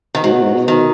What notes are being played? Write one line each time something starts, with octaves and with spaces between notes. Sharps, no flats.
D#3
G#2 F#3
B2
G#2
B2
D#3